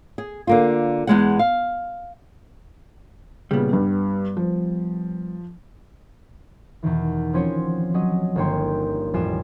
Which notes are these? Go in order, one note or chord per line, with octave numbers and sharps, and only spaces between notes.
G#4
D3 A#3 F4
E2 G#3 F#5
F5
A#2 C#3 G3 B3
G2
F3
E2 B2 D#3 E3
F3 C4 C#4 F4 C#5
F#3 C#4 D#5
G1 D#3 A#3 C#5 G5 C6
A1 F2 G3 F4 G#5 E7